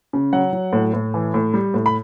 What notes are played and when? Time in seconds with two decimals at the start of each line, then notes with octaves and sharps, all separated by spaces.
0.13 C#3
0.33 F#3 F#5
0.53 F#3
0.73 A2
0.94 A2
1.14 E3
1.34 A2
1.54 G3
1.74 A2
1.86 B5